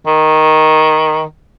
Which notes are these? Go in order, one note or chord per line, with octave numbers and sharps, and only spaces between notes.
D#3